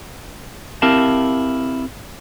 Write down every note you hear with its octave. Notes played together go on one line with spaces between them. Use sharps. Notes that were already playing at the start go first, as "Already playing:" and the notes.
C4 E4 G4 A#4 F5 A5